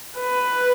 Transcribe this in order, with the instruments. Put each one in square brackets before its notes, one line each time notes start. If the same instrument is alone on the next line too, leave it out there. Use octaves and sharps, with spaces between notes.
[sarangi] B4